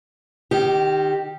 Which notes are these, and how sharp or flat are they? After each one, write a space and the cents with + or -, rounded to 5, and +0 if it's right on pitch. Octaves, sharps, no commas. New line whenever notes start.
D#3 -20 G4 +0